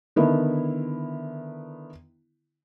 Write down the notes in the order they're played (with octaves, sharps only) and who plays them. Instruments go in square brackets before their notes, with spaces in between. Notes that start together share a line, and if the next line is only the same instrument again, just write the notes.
[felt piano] D3 D#3 B3 E4